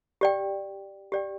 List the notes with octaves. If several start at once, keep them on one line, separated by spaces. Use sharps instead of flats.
G4 D5 G5
G4 D5 G5